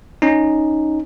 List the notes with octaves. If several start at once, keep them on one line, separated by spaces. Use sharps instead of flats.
C#4 D#4